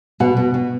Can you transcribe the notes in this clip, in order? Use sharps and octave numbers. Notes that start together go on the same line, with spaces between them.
B2 F#5
B2
B2